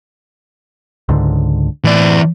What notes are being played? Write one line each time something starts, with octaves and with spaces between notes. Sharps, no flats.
C#2 G#2 D3
A2 E3 D5